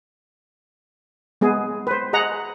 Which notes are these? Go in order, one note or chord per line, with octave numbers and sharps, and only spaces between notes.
G#3 B3 G#4
B4 C5
G#4 D#5 F#5 A#5